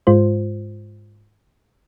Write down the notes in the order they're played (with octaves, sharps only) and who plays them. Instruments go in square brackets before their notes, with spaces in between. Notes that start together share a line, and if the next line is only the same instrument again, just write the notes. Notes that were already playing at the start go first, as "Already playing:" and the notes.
[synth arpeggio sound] G#2 G#3 F4 C5